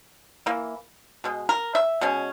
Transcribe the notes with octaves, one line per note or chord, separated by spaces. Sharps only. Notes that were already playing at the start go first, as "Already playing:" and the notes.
E3 A#3 E4
B2 G#3
A#4
E5
B2 G#3 C#4